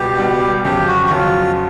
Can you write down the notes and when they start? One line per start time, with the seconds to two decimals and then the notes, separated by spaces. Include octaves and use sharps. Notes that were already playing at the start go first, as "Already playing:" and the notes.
Already playing: C#2 B2 G3 B3 G4
0.18 C#2 B2 G3 B3
0.65 F2 C#3 F#3 G4
0.88 F#4
1.07 F#4
1.10 F2 C#3 F#3 F4